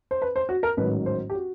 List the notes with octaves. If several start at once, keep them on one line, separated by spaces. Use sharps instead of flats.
C5
B4
C5
F#4
A#4
A1 G#2 D#3 F#3 B4
C5
G4
F#4